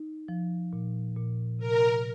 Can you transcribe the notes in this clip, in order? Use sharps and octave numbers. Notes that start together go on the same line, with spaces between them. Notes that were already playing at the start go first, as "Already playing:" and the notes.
Already playing: D#4
F3
A#2
A#2
C3 A#4